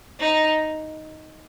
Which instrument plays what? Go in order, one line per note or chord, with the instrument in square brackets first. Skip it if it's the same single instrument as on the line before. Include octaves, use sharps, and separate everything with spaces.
[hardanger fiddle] D#4